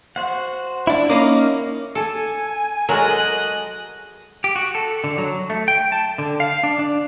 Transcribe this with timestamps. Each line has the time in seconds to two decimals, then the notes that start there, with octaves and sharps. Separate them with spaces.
0.16 F#4 C5 F#5
0.87 D4 E4
1.10 A#3 C#4 D#4 A#4 D6
1.95 A4 G#5
2.89 F#3 G#3 A4 A#4 D#5 F#6
4.44 G4
4.56 F#4
4.75 A4
5.04 D3
5.18 F#3
5.50 A3
5.68 G5
5.92 A5
6.18 D3
6.40 F5
6.63 D4
6.79 D4